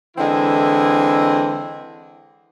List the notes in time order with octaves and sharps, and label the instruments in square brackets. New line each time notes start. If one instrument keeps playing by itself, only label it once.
[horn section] D3 E3 G#3 C4 E4